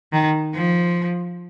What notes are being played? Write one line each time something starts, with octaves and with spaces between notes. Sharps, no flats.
D#3
F3